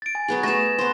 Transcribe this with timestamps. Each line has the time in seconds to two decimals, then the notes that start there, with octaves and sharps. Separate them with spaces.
0.02 A6 D7
0.15 G#5
0.28 F#3 B3 G#4
0.43 A3 G#4 A#6 E7
0.78 B3 C5